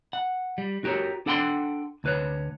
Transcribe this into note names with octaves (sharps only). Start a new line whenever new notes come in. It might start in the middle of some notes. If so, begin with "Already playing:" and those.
F#5
G3
F#4 G4 A#4 C5 C#5
D4 A4 F#5 G5 A#5 C6
D2 B4 C#5